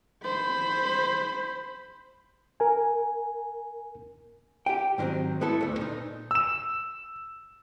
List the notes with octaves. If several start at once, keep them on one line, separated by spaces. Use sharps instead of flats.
C5 B5
A#4 G#5
G4 G5
G#2 D#3 F3 F#3 C4
A3 B3 E4 A4
D2 A3
A#2 D#4
E6 E7